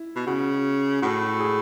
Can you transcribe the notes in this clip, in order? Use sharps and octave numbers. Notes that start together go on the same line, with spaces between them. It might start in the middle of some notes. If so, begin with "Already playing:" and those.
Already playing: E4
B2
C#3 F#4
A2 F#4
G#4